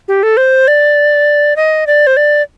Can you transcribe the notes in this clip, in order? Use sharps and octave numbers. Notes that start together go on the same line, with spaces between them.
G4
A4
C5
D5
D#5
D5
C5
D5